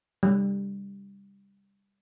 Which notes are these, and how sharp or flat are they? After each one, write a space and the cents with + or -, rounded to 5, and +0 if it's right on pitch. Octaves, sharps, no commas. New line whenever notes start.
G3 +20